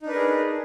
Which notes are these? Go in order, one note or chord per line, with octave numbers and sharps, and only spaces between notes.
D4 D#4 G#4 A#4 B4